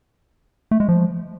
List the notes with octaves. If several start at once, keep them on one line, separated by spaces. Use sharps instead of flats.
A3
G#3
F3